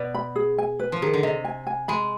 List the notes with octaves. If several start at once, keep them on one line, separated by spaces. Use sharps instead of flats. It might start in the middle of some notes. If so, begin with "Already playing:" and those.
Already playing: B2 D5
B5
G#4
G#5
B4
F3
D#3 G#4
D3
C3 D#5
G#5
G#5
G#3 B5